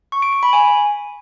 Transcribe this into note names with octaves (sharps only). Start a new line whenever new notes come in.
C#6
D7
D7
B5
G#5